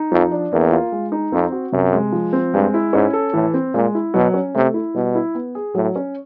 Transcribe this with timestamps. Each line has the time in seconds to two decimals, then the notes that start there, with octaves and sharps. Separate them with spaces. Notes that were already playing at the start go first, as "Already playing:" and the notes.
Already playing: D#4
0.11 F2 F3
0.31 D4
0.52 E2 A#3
0.72 F4
0.92 G#3
1.12 D#4
1.32 F2 C4
1.52 F#4
1.72 F#2 C3
1.93 G#3
2.12 F3
2.33 C4
2.54 G2 G#3
2.74 E4
2.93 G#2 C#4
3.13 A4
3.33 A2 E3
3.54 C4
3.73 A#2 G#3
3.95 E4
4.14 B2 F#3
4.34 C#4
4.55 C3 A3
4.74 E4
4.95 B2 G3
5.15 E4
5.35 B3
5.55 G#4
5.75 A2 F#3
5.96 C#4